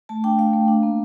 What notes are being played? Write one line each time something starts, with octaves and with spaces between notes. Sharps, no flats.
A3 A5
D4 G5
A3 F5
A3
D4
A#3